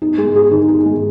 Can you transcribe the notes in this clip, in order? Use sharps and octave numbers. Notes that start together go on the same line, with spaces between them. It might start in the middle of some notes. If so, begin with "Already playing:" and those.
D#4
G#3
G#4
D#3
D#4
G#3